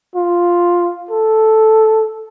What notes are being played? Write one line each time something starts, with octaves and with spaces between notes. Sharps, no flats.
F4
A4